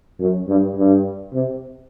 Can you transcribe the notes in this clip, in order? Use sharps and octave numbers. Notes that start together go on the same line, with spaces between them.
F#2
G2
G2
C3